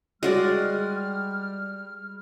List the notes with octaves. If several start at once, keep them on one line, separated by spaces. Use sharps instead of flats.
G3 G#3 F#4 D5 F6